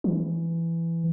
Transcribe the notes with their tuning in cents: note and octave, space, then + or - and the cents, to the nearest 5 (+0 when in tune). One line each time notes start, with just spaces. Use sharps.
E3 +15